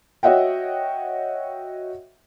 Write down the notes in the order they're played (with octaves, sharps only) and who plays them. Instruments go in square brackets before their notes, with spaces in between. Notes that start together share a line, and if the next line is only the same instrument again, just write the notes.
[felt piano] F#4 C#5 D#5 E5 F#5 G5